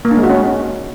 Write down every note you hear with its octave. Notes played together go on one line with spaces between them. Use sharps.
A#3
D4
G#3
F#4
C#4